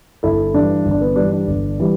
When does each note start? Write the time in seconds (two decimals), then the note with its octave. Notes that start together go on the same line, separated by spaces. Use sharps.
0.23 G1 E4 A4
0.54 G2 E3 G3 D4
0.85 G1
0.91 D4
1.01 B3
1.16 G2 E3 G3 D4
1.32 D4
1.47 G1
1.80 E3 G3